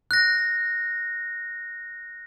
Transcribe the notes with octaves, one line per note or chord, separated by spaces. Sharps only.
F#6 A#6